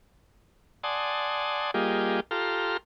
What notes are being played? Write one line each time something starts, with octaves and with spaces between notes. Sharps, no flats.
D5 F#5 G#5 A5 C6 D#6
G3 A#3 F4 G4 G#4 D#5
F4 G4 A4 A#5 C6 F6